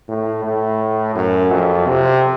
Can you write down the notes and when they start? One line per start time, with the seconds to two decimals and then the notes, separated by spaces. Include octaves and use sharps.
0.08 A2
0.44 A2
1.15 F#2
1.51 F2
1.87 C3